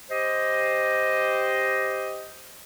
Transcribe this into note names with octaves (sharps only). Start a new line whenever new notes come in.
G4 C5 D#5